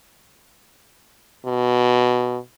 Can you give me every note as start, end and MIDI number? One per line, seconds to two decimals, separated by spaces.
1.45 2.37 47